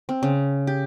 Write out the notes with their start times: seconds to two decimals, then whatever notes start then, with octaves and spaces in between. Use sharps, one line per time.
0.09 C4
0.23 C#3
0.67 G4